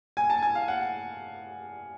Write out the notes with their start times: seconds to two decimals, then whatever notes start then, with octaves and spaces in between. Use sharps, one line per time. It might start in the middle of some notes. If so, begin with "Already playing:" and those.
0.17 G#5
0.30 A5
0.42 G#5
0.55 F5
0.68 F#5